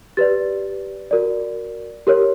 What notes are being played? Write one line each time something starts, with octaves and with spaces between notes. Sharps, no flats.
G4 B4 D5 A6
F#4 A#4 D5
G4 A#4 C#5